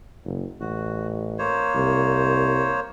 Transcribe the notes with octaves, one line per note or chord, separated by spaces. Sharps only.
F#1
A1 F#4
A#3 C5 C#5
C2